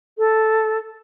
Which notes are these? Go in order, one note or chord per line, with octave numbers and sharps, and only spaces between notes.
A4